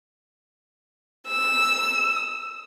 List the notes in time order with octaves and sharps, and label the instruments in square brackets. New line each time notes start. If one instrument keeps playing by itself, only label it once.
[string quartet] E6